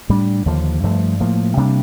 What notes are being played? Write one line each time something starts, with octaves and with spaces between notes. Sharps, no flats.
A2 G3 D4
D#2 D3 F3
G2 F3 A3
A2 F3 A#3
C3 G3 A#3 D4